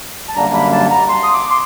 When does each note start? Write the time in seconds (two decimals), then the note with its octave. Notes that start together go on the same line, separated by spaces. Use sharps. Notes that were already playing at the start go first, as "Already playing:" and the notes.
0.29 A5
0.36 F#2 D3 G3 A#3 D4 A#5
0.54 B5
0.72 A5
0.91 A#5
1.09 C6
1.23 D#6
1.34 D6
1.50 C6